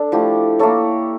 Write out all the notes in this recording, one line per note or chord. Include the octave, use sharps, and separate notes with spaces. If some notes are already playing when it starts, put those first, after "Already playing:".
Already playing: D4 A4
F3 A3 E4 G4
A#3 E4 A4 C#5